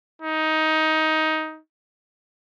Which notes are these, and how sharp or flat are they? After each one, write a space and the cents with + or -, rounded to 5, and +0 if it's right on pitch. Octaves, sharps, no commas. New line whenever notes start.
D#4 +15